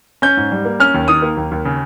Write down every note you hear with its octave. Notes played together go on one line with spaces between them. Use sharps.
C#4 G6
G#2
G3
A#3
C#4 F6
D#2
D#3 D#6
A#3
D#2
D#2
C#3